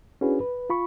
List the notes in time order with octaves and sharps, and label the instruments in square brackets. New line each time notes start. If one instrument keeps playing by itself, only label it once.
[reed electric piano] C#4 D4 E4 F#4 G#4 B4
B4
F4 B5 C#6